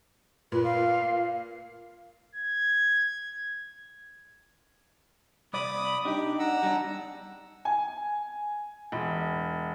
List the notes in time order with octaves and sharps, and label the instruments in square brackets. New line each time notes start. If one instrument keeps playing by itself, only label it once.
[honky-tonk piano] A#2 [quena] B4
[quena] F5
[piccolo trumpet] G#6
[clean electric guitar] C2 D5 [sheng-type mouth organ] B5 D6 D#6
[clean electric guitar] D4 D#4 [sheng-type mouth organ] G4
[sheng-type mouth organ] F#5 A#5 E6
[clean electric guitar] G3 D4
[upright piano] G#5
E1